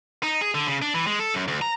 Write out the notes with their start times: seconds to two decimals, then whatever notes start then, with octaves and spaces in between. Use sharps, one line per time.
0.23 D#4
0.41 G#4
0.55 D3
0.67 C#3
0.82 D4
0.94 E3
1.07 G#3
1.20 A4
1.34 F#2
1.48 D2
1.61 A#5